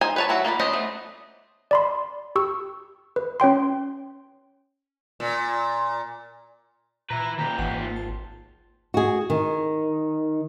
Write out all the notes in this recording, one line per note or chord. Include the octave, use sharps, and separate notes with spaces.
D#4 C5 G#5
B4 C#5 A5
F#3 E4 F#4
A#3 F4 D5 B5
C#4 D4 C5 D5 D#5
A3 B3
D5 B5 C6
G4 C#6 E6
B4
C#4 C#5 G5 C6
A#2
A#2 E4 B4 A#5
A#2 D#3 G4 A#5
G#1 E3 F#5
F4
A5
F#4 G#4
D#3